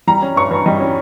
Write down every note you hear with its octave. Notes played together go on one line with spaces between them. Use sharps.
G3 A#5
C#4
G2 C#6
G2
G3 D#5
C#4